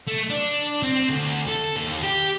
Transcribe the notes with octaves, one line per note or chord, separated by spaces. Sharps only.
A3
D4
C4
D2
A4
D#2
G4